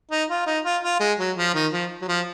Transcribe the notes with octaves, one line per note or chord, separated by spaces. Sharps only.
D#4
F4
D#4
F4
F4
G#3
F#3
F3
D#3
F3
F#3
F3